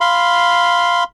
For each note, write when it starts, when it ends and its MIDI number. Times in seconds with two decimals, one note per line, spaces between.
0.01 1.04 77
0.01 1.04 83
0.01 1.04 84